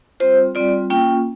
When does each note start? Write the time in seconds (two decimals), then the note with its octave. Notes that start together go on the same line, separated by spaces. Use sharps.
0.20 G3 C4 F4 C5
0.55 G3 C4 F4 D5
0.90 A#3 C#4 F4 G5